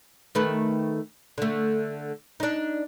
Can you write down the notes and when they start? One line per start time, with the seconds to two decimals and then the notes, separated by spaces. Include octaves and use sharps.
0.35 D#3 A3 B4
1.38 D3 A3
2.40 D4 D#4